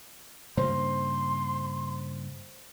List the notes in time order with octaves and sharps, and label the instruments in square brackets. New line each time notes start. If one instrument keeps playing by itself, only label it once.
[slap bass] G2 C#3 A#3 [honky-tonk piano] C5 [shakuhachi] C6